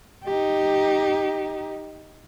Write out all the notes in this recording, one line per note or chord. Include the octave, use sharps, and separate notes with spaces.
D#4 G4